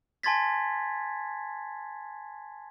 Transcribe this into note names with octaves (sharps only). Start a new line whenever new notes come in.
G#5 A5 C6 G#6 A6 B6